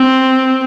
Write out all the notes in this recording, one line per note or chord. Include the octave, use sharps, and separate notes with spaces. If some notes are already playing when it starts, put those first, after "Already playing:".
Already playing: C4